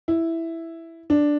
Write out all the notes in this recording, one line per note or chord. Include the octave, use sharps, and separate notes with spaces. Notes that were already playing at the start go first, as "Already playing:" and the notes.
E4
D4